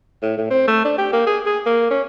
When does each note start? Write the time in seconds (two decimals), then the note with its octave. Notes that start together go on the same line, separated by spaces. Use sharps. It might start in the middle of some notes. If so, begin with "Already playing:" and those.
0.22 A2
0.38 A2
0.50 C4
0.68 A3
0.85 D4
0.98 G4
1.13 A#3
1.26 G#4
1.46 G#4
1.66 A#3
1.90 C#4